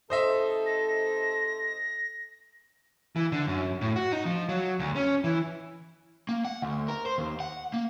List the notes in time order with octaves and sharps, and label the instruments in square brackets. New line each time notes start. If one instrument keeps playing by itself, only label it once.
[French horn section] C3 D#4 A4 [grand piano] C5 D#5 E5 [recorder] D#6
[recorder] A#6
[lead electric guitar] E3
D3
F#2
A2
F#4
D#4
F3
F#3
D2
C#4
E3
[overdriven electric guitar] A#3
F#5
D2
A#4
C5
D#2
F#5
A#3